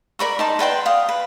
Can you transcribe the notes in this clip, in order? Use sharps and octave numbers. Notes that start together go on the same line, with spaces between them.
A#4 D5 B5 C#6
D#4 A5 C6
B4 D5 G5 C6
F5 D#6
B4